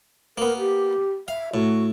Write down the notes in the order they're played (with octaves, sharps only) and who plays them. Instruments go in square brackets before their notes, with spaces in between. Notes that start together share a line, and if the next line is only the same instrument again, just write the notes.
[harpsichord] A#3 B3 [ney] A#4
[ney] G4
[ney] E5 [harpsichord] F5
[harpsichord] A2 [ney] F#4